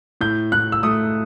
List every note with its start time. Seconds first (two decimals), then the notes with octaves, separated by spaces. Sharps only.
0.21 A2 G6
0.52 A2 F#6
0.72 E6
0.83 A3 D#6